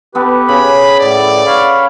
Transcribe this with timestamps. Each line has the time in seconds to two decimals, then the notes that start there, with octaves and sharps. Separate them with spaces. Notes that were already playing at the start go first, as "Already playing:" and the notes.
0.15 B3 G4 A4 B4
0.49 C#3 B5
1.00 A2 D5
1.47 C#5 F5 B5